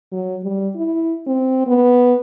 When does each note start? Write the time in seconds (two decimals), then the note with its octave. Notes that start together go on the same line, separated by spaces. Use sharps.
0.12 F#3
0.43 G3
0.76 E4
1.27 C4
1.67 B3